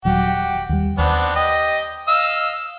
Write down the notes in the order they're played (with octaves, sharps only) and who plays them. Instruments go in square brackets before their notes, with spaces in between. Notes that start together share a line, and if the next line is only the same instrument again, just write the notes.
[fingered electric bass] D#1 F#3 [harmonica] F#4 G4
[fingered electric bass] D#2 G3
[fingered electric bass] D#2 [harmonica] B3 C4 D4
[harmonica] G4 D#5
D#5 F5 E6